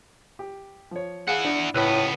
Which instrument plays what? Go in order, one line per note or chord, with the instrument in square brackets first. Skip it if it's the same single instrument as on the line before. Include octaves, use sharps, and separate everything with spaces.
[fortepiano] G4
F3 C#5
[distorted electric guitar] E4 F#5 [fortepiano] G#4 F5
[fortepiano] D4
[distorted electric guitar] C#2 B3 [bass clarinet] A2 [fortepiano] B4 E6 F#6